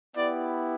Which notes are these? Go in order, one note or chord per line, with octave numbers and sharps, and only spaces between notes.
B3 E4 G4 D5